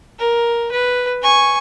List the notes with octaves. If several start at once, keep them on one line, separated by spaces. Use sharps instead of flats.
A#4
B4
G#5 C#6